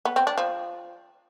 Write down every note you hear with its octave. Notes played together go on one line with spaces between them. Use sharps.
B3
C4
D4
F3